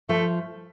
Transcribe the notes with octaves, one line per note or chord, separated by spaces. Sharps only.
F3 A3